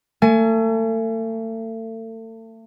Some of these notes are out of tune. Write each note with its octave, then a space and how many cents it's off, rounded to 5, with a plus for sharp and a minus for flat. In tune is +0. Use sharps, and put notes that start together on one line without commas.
A3 +35 G#5 +25